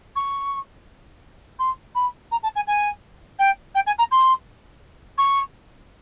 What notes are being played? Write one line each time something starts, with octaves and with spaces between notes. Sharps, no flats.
C#6
C6
B5
A#5
A5
G#5
G#5
G5
G5
G#5
A#5
C6
C#6